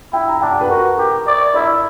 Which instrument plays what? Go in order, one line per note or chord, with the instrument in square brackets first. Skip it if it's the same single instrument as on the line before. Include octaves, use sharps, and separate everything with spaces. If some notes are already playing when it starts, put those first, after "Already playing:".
[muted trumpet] E4 [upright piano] G5
[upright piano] A#5
[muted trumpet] D4 [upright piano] G5
[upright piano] F#5
B4
[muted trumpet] F#4 [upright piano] A#4
[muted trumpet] G4 [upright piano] A#4
[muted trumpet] D5
[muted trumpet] E4 [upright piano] D5